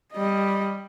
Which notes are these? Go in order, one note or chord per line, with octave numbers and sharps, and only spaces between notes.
G3 D#5